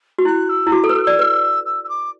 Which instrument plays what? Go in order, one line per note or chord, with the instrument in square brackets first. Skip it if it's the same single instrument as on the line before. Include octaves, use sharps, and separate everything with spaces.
[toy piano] F#4
[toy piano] E4 [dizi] F#6
[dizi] E6
[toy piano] E4
[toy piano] F#4 [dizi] D6
[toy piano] A4
[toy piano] B4 [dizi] E6
[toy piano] A4 [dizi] F#6
[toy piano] D5 [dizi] E6
[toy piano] B4
[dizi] E6
E6
D6